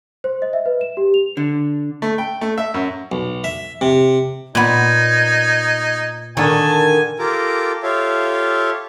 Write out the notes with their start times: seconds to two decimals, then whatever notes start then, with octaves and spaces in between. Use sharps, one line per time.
0.24 C5
0.42 D#5
0.53 E5
0.66 B4
0.81 E7
0.97 G4
1.14 F7
1.37 D3
2.02 A3
2.18 G5
2.41 A3
2.58 E5
2.74 F#2
3.12 B1
3.44 E5
3.81 C3
4.55 A#2 B3 D#4 G#6
6.37 D3 D#3 C#5 G#5 A5
7.19 F4 G4 A4 A#4 A#5 D6
7.83 F4 G4 A4 C#5 E5 F5